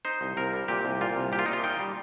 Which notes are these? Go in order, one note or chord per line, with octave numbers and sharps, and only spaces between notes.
D#4 C5
C2
C2 A#4
G3
A#2 G4
C2
A#2 F4
C2
A#2 G4
F4
A#2 D#4
F4
D#4 G5
G3